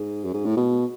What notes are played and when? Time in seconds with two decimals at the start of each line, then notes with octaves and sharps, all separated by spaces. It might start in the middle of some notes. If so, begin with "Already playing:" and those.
Already playing: G#2
0.24 F#2
0.34 G#2
0.45 A2
0.57 B2